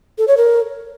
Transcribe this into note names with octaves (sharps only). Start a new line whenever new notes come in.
A4
C#5
A#4